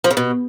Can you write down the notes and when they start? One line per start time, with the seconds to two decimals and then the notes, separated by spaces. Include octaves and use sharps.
0.04 F3
0.11 C#3
0.17 B2